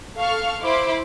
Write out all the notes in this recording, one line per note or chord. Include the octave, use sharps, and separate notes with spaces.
A4 F5 C#6 F6
E4 C5 B5 C6 D6